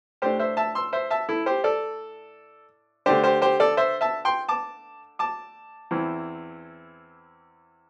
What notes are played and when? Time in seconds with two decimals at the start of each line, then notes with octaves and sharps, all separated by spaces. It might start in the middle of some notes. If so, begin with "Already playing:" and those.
0.22 A2 A3 D4 G4 C5
0.39 C5 E5
0.57 E5 A5
0.75 C6 E6
0.93 C5 E5
1.11 E5 A5
1.29 E4 A4
1.46 G4 C5
1.64 A4 D5
3.06 D3 A3 D4 G4 C5
3.24 G4 C5
3.42 G4 C5
3.60 A4 D5
3.77 C5 E5
4.01 E5 A5
4.25 G5 C6
4.48 A5 D6
5.19 A5 D6
5.91 E2 E3 C4 E4